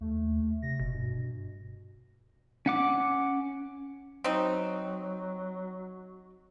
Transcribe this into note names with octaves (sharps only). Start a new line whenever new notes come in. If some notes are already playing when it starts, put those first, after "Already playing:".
D#2 A3
C3 A#6
F#1 B2
G2 B2
C#4 F#5 D6
F#3 C4 D#4